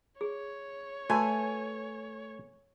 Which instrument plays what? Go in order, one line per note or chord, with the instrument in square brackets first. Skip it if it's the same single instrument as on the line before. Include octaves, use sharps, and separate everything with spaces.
[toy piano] G#4 [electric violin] C#5
[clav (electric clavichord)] A3 B4 [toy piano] F#4 [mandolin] G#5